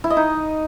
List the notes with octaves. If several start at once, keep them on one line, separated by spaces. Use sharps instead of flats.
E4
D#5
D#4